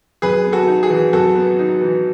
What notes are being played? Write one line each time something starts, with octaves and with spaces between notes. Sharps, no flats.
F#2 G#4 B4
B3
F#4 A4
D#4
G#4
E3
F#2 F#4 A4
B3
D#4
E3